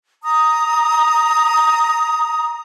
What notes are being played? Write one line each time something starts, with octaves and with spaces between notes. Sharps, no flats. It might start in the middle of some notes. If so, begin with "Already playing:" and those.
A#5 D#6